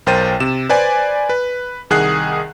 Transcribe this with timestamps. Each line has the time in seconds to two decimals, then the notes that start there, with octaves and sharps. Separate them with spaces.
0.06 B1 A#4 C5 G5 A6 D#7
0.40 C3 E7
0.69 B4 C5 D5 G#5
1.29 B4
1.90 C2 D#3 G#4 F#5 F#6 C7